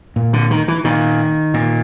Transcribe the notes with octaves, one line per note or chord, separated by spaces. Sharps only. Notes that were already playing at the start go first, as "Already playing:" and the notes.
A#2
D3
D#3
E3
A#2 D#3
A#2